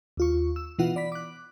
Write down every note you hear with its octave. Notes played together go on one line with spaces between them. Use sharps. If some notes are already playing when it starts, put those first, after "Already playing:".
D#2 F4 C#6
E6
B2 E3 B3 F4 F#5
D5 B5 B6
D6 F#6